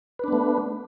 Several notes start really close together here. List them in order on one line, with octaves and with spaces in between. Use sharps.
B4 D4 B3 A3